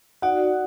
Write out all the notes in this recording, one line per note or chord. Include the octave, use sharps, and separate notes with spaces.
D#4 F#4 D5 F#5